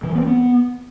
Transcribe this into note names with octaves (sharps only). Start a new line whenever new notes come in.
E3
F#3
B3
C4
B3